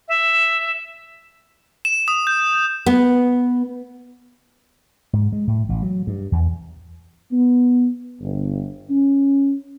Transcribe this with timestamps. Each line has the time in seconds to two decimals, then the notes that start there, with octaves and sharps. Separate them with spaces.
0.08 E5
1.85 E7
2.08 D#6
2.27 G6
2.86 B3
5.13 G#2
5.32 G#3
5.47 A2
5.69 A1
5.83 F#3
6.07 G2
6.32 E2
7.31 B3
8.21 G1
8.90 C#4